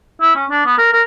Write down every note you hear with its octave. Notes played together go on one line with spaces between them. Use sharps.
E4
C#4
D4
B3
A#4
A#4